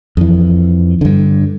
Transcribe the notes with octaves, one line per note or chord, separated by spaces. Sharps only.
F2 E3
G2 D3